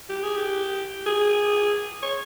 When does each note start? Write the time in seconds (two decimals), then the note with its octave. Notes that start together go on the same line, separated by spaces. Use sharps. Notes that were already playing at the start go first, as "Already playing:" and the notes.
0.10 G4
0.23 G#4
0.36 G4
1.07 G#4
2.02 C#5